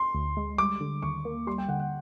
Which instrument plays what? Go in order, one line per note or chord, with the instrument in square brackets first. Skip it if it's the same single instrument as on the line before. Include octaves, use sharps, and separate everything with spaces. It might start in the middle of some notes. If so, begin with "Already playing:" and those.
Already playing: [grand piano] C6
[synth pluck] D2
G#3
[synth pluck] G3 [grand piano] D6
[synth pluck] D3
[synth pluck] D#2 [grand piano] C#6
[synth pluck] A#3
[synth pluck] G3 [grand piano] C6
[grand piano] G5
[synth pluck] D3 [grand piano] F#5
[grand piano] F#5